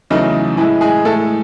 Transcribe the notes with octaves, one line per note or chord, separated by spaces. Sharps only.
E2 C#3 F#3 A3 D#4
A2 E3 G#3 E4
G#3 G#4
A2 G#3 A3 A4